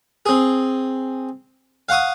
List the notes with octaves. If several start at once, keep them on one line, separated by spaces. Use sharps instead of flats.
C4 G#4
F5 F#5 C#6 D#6